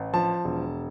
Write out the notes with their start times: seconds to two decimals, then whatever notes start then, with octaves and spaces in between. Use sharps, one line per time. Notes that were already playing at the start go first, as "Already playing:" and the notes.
Already playing: A1
0.14 F3 A5
0.44 E1